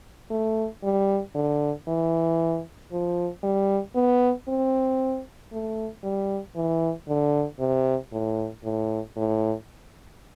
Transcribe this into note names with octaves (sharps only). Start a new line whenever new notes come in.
A3
G3
D3
E3
F3
G3
B3
C4
A3
G3
E3
D3
C3
A2
A2
A2